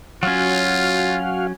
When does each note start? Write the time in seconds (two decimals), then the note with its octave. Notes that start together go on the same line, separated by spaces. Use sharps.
0.23 F#3 C#4 F4 F#4 F5